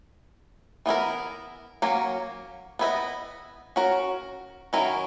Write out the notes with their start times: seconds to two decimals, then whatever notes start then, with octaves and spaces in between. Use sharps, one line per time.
0.86 E3 B3 E4 A#4
1.82 F#3 A#3 C#4
2.79 B3 E4 B4 D#5
3.76 C#4 F#4 A#4
4.73 D#3 F#3 C#4 E4 A#4